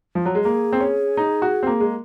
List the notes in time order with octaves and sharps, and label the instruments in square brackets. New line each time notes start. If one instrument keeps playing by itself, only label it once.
[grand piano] F3
F#3
G#3
[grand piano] A#3 [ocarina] G#4
[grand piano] C4
C#4
D#4
F#4
C4
A#3
G#3